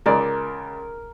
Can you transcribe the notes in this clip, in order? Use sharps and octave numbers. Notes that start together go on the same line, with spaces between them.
C#2 A#4 D5